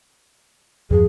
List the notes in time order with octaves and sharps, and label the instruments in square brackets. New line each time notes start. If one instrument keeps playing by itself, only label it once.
[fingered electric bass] E2 G2 F3 [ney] G#4